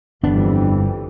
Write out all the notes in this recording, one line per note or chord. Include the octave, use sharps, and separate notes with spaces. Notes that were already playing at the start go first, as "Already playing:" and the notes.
G1 F2 E3 G3 B3 D4